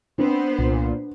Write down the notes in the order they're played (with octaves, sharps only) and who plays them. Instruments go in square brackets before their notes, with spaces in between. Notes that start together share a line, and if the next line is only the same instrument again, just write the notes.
[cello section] B3 C5 [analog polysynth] C4 [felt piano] D4
[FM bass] C2 [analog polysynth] A#2